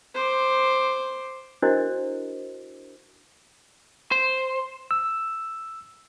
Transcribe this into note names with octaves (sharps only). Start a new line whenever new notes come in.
C5 D6
D4 E4 F#4 A#4 C5 D#5
C5
E6